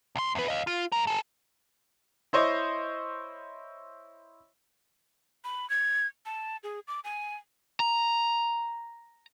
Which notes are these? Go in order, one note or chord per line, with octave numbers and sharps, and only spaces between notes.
C2 C6
E2 B4
D#5 F5
F4
G2 A#4
G#4 A4
E4 C5 C#5 D#5
B5
G#6
A5
G#4
D6
G#5
A#5